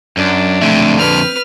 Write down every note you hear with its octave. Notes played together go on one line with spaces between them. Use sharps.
F#2 D4
B1 F2 D3 A3 E5
C4 B4 F6